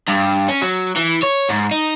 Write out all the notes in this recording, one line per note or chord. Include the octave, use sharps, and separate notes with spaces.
G2
C#4
F#3
E3
C#5
G#2
D#4